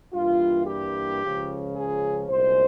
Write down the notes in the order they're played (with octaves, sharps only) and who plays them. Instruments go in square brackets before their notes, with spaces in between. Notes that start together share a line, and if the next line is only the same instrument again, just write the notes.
[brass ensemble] G2 E3 G3 A#3 F4
G4
C#2 C#3 F3
G#4
C2 A#2 G#3 C#4 C5